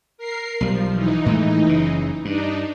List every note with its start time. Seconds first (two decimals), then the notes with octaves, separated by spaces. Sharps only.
0.18 A#4 C7
0.61 B1 F3 G3
0.93 E3 D#4
1.26 A2 G#3 A3
1.67 F#1 C#3
2.25 G2 D4 D#4